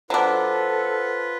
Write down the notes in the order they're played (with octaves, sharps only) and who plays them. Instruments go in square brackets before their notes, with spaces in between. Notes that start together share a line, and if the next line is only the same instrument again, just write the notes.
[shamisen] F#3 D4 [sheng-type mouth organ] F4 B4 [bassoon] A4 [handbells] C5 F#5